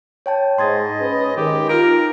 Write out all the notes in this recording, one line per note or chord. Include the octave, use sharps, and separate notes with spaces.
C#5 G5 A5
G#2 D#5 C6 G#6 A6
C#4 B4
D#3 G#3 G4
D#4 F4 A#4 F6 D7